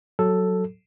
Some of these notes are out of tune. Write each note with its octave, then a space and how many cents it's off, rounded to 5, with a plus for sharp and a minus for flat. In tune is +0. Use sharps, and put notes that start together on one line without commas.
F#3 +0 A4 +5